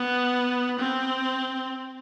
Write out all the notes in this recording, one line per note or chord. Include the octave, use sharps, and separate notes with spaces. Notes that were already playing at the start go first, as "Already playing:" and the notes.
Already playing: B3
C4